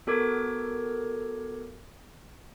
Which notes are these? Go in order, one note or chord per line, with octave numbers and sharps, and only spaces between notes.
B3 F#4 A4 A#4 D6 G#6